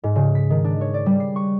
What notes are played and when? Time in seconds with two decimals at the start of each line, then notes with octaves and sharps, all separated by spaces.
0.04 G#2
0.16 C#3
0.35 B6
0.50 D#3
0.64 D4
0.81 C#5
0.94 D5
1.06 G3
1.20 C7
1.36 C#6